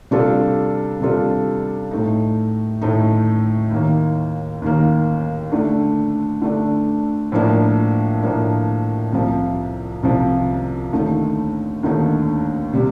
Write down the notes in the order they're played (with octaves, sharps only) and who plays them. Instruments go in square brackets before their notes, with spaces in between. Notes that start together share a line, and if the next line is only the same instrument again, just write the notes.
[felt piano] C3 G3 D4 F4 A4
C3 G3 D4 F4 A4
A2 A3 D#4
A2 A3 D#4
D#2 D#3 A#3
D#2 D#3 A#3
D3 A3 D4
D3 A3 D4
A2 F3 A#3 D4
A2 F3 A#3 D4
C2 C3 F3
C2 C3 F3
D#2 D3 A3 D#4
D#2 D3 A3 D#4
C3 G3